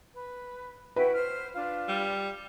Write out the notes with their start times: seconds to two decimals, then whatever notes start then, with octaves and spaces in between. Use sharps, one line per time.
0.15 B4
0.96 E4 F#4 B4 G5
1.14 C5 F6
1.55 D4 F4
1.89 G3